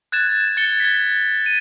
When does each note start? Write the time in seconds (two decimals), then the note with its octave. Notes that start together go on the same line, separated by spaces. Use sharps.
0.12 F#6 G#6 A6 E7
0.57 G#6 A6 C#7 G7
0.80 G#6 B6
1.46 D#7